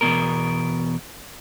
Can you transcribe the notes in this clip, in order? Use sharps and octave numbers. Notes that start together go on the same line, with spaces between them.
E2 G2 B2 A#4